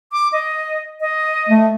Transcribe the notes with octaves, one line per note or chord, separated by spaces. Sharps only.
D6
D#5
D#5
A3